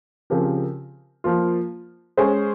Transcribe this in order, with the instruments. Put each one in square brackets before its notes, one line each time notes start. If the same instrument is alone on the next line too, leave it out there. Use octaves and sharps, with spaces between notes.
[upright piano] C#3 F3 C4 G4 A#4
F3 A#3 F4
G#3 C#4 G#4 C5